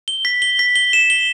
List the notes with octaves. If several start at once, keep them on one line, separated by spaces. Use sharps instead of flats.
G7
B6
G7
B6
G7
E7
G7